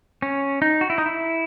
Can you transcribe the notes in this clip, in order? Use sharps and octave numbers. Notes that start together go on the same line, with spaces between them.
C#4
D#4
F#4
E4
D#4
E4